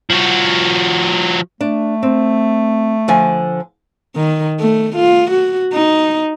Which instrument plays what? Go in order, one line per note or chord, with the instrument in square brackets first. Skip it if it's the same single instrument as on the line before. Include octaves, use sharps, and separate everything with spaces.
[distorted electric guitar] F3 F#4
[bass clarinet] A3 [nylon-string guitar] D4
[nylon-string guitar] C4
D3 F3 G#5
[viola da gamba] D#3
A3
F4
F#4
D#4